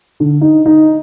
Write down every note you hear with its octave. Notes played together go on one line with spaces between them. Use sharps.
D3
D#4
D#4